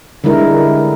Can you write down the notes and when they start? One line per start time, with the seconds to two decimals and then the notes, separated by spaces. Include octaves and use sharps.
0.24 D3 G3 G#3 E4 A#4